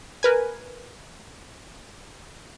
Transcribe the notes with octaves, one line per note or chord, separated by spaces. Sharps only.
A#4 B4 G#5